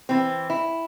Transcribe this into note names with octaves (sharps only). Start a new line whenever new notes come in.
E3 C4
E4